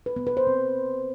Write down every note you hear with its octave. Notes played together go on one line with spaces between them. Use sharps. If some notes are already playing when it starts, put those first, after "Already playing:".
B4
B3
B4
C5
C4